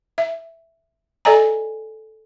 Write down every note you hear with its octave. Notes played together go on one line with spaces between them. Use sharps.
E5
A4 D5 D#5 G#5 A#5